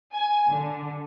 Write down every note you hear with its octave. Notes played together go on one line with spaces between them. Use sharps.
G#5
D3